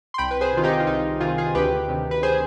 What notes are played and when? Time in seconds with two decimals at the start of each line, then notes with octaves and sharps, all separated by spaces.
0.14 C6
0.18 C2 G5 B5
0.31 B4
0.41 G#4 C5
0.53 C3 D#3 F4
0.63 D#4 G4
0.80 F4
0.87 C2 D#4
1.20 C3 D#3 F4 G#4
1.38 F4 G#4
1.55 D2 G4 B4
1.88 C3 D#3
2.11 B4
2.23 G#4 C5